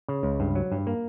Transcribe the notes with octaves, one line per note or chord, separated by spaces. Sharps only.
C#3
C#2
G2
F#3
G2
A#3